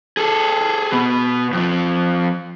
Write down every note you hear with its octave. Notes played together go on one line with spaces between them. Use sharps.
G#4 A4
B2 B3
F2 F3